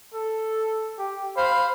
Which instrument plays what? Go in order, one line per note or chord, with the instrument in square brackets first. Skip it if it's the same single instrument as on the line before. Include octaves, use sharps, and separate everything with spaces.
[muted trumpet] A4
G4
[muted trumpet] C5 [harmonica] F5 B5